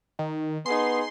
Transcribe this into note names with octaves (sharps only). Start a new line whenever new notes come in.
D#3
B3 D#4 G#4 C6